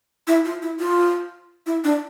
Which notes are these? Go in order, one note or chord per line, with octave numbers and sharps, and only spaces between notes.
E4
F4
E4
F4
E4
D4